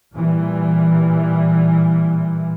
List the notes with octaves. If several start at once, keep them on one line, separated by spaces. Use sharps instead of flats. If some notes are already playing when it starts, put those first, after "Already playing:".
A#2 E3 G3